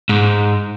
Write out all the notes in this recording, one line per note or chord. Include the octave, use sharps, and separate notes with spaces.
G#2